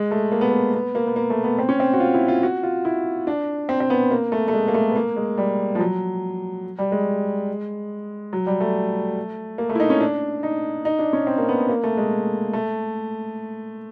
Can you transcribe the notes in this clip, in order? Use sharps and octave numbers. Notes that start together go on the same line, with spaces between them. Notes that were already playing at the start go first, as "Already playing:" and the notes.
Already playing: G#3
A3
A#3
B3
A#3
B3
A#3
B3
A#3
A3
B3
C4
C#4
C4
F#4
F4
E4
F4
F#4
F4
E4
D4
C4
C4
B3
A#3
A3
A3
G#3
A#3
A3
B3
A#3
G#3
G3
F3
F#3
G3
G#3
F#3
G3
A3
A#3
A3
E4
D#4
C#4
D4
D#4
D#4
D4
C#4
C4
A#3
B3
A#3
A3
G#3
A3